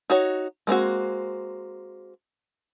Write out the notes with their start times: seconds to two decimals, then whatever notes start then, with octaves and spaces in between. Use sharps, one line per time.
0.10 D#4 F#4 C#5
0.67 G#3 A#3 C4 F#4